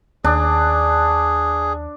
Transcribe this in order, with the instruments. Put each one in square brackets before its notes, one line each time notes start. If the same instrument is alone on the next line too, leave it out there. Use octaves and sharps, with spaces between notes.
[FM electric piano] D#2 [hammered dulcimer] D4 [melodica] G#4